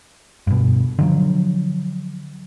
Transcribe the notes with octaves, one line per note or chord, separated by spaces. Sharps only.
G2 B2
D3 F3 F#3